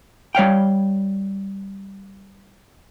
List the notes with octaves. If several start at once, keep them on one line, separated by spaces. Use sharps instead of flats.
G3 C#5 F5 G5